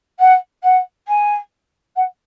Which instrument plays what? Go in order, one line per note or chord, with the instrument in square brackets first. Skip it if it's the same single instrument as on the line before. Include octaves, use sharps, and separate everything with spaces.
[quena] F#5
F#5
G#5
F#5